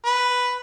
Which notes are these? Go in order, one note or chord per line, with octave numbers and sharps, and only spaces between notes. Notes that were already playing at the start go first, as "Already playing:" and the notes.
B4